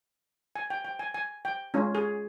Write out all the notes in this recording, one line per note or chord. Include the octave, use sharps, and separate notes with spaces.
G#5
G5
G5
G#5
G#5
G5
G#3 C#4 F4
G#4